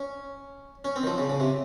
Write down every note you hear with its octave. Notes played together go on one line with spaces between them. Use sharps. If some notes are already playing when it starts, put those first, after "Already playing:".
Already playing: C#4
C#4
C4
D#3
F3
C#3
C#3
C3